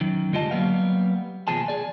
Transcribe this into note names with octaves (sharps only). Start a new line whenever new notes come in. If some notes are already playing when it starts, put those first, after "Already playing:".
F#2 D#3
D3 G#3 F4 G4 D#5 A5
F#3 G3 A#3 B3 F5
D#2 B2 F3 G#4 A5
G#4 D5